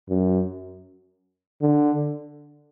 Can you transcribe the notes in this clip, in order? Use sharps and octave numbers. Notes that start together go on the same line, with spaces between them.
F#2
D3